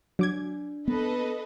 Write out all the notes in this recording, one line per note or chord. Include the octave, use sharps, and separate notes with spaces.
F#3 D4 D6 G#6
B3 A4 B4 D#5